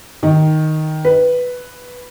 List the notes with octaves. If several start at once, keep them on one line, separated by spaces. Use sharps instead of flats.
D#3
B4